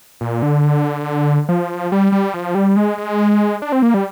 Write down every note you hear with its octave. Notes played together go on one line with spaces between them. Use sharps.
A#2
D3
F3
G3
G3
F3
G3
G#3
G#3
D4
C4
A#3
G3